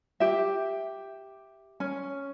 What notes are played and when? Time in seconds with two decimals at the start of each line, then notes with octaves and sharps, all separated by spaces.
0.20 G4 E5
1.80 C#4